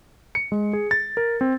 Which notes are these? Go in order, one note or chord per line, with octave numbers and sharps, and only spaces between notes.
C#7
G#3
G#4
A6
A#4
C4